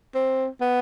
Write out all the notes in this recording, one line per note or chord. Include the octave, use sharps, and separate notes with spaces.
C4
B3